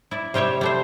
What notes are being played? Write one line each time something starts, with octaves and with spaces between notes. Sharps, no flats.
E4 D5
C3 G3 G4 C#5 E5
G3 A3 C5